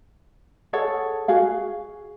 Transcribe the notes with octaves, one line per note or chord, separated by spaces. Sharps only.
G#4 A4 C#5 F#5
F#4 G#4 F5